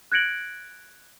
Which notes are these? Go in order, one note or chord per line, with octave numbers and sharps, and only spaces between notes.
F#6 G#6 A#6 C#7 D7 F#7